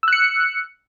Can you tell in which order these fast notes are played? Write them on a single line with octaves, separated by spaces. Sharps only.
E6 F#6 C#7